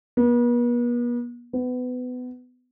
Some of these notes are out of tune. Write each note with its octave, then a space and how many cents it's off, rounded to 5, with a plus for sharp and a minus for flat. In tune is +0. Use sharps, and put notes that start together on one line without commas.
B3 -40
B3 +25